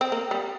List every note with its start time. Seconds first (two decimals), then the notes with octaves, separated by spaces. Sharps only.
0.01 C4
0.12 A#3
0.31 G3